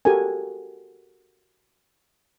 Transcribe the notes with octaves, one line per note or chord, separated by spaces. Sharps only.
F#4 G4 A4 A#4 G#5